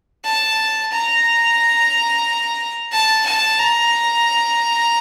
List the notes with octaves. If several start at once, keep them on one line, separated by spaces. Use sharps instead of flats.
A5
A#5
A5
A5
A#5